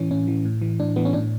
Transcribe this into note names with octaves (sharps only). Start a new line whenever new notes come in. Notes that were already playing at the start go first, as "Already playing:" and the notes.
Already playing: A2 E3 C#4
A2 C#4
E3
A2
E3
A2 D4
E3 B3
C#4
A2 D4